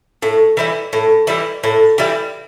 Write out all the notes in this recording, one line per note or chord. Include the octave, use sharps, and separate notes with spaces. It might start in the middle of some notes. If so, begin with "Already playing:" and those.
A2
E3 G3 E4
A2
E3 G3 E4
A2
E3 G3 E4